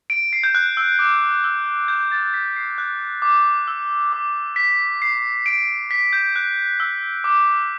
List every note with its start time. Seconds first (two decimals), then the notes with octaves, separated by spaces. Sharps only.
0.10 D7
0.33 C7
0.44 G6
0.55 F#6
0.77 E6
0.99 D6
1.44 E6
1.88 G6
2.12 A6
2.34 B6
2.56 C7
2.78 F#6
3.22 D6
3.68 E6
4.13 D6
4.56 B6
5.02 C7
5.46 D7
5.91 B6
6.13 G6
6.36 F#6
6.80 E6
7.24 D6